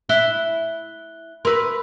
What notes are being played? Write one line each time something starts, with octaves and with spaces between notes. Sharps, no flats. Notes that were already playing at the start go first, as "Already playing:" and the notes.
E4 F#6 G7
A#4 B4 C6 E6